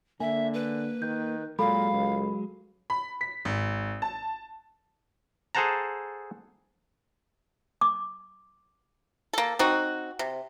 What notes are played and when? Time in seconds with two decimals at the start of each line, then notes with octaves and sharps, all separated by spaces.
0.20 D3 A#3 E5 G#5
0.53 B4
1.02 D#3 G6
1.59 A#2 F#3 G#3 A4 F5 B5
1.93 C#2
2.90 B5
3.21 B6
3.45 G#1
4.02 A5
5.55 G#4 A4 C5 F#5 A5 A#5
7.81 D6
9.33 A#3 A4
9.59 C4 D#4 F#4
10.19 C3